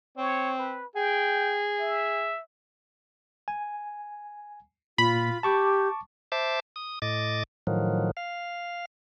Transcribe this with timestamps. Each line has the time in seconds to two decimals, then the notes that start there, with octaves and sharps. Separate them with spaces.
0.18 C4 C#5
0.58 B4
0.96 G#4 G5
1.80 E5
3.48 G#5
4.98 A#2 F4 B5
5.43 G4 A5 C#6 D6
6.32 C5 E5 A5 D6
6.76 D#6
7.02 A2 D#5 D6 A6
7.67 A2 D#3 F3 F#3
8.17 F5